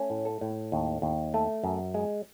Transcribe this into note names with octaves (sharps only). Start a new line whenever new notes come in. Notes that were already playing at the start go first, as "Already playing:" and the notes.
Already playing: A3 C#4
A2
A4
A2
D#2
D#2
A3
F#2
G#3